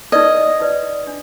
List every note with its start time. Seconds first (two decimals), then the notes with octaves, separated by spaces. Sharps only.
0.12 D#4 B4 D5 D#5
0.60 D#4 B4 D5
1.07 D4